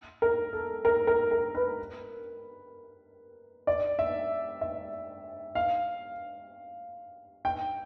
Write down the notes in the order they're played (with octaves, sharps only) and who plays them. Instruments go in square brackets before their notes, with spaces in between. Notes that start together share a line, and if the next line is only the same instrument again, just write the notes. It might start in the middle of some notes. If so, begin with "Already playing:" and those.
[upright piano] A#4
A4
A#4
A#4
A#4
B4
D5
E5
E5
F5
G5